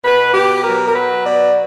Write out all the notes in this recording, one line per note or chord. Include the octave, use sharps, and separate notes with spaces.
B2 B4
B2 G4
F#3 A#4
A#4
F#3 B4
B2 D5